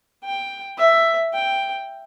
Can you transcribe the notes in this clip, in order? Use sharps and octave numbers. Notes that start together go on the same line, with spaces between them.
G5
E5
G5